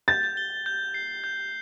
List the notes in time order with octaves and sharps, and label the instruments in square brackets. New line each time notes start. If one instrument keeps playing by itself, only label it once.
[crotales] G6 [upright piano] A6
[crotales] G7
G6
C7
G6